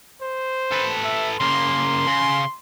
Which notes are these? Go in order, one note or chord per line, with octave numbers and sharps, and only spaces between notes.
C5
A4 B4
E5
C#3 A#3 C6
C#3